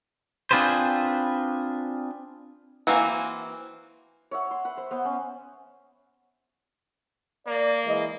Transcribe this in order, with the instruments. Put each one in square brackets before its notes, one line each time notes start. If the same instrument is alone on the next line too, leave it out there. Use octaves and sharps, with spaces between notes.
[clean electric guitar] C4 D4 F4 G#4 B4 C5
[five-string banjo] E3 A#3 C4 F#4
[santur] C#5 E5 F#5
C6
B4 F#5
C5
B3 C5
C#4
[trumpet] A#3 [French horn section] D5
[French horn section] E3 G#3 D#5